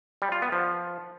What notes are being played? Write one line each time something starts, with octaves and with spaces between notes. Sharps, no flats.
G3
F4
B3
F3